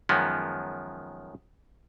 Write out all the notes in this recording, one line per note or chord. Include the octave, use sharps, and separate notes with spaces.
F#2 D#3 F3 G#3 B3